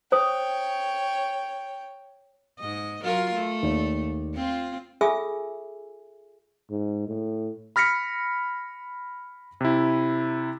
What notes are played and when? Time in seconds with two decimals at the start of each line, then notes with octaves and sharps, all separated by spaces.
0.12 C5 C#5 G5 D#6
2.59 G#2 D#5
3.04 F#3 F4 A#4
3.33 A3
3.63 D#2 D5
4.35 C4 F4
5.01 F4 G#4 A4 E5 G#5 E6
6.70 G#2
7.08 A2
7.76 B5 F6 A#6 B6 C#7
9.61 C3 E4